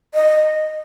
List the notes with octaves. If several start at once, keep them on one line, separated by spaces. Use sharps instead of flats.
D#5